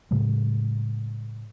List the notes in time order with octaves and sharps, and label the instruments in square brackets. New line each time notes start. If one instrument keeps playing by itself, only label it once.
[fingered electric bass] A2 C#3 F#3 G#3